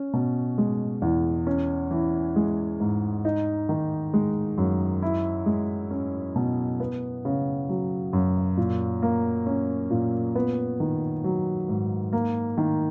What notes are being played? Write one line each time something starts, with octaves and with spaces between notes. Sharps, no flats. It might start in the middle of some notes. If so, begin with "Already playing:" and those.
Already playing: C#4
B2
G#3
E2
C#4
E3
G#3
G#2
D#4
D#3
G#3
F#2
E4
G#3
C#4
B2
B3
C#3
F#3
F#2
A#2
A#3
C#4
A#2
B3
D#3
F#3
G#2
A#3
D#3